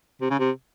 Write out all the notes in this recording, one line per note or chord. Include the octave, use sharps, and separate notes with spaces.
C3
C#3
C3